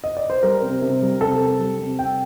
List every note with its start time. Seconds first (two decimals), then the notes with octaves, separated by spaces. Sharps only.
0.04 D#5
0.17 D5
0.30 C5
0.43 G3 A#4
0.62 C3
0.82 C3
1.02 G3
1.20 C3 A4
1.40 C3
1.60 G3
1.79 C3
1.98 C3 G5